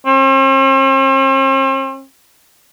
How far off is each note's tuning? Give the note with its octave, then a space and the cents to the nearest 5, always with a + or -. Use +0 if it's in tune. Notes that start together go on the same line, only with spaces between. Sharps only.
C4 +45